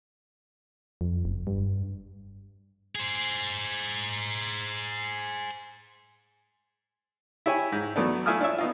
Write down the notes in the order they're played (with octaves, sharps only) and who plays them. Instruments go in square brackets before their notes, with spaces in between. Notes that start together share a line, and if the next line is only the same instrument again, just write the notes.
[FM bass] F2
F#1
G2
[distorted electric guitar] G#4 C5
[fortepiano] E4 G4 C#5 G#5
G#2
E3 F#3 A3 B3 D4
A3 E4 F4 G#5 D#6 F6
D4 C#5 E5
B3 D#4 F4